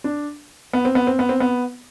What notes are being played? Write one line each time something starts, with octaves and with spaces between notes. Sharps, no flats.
D4
B3
C4
B3
C4
B3
C4
B3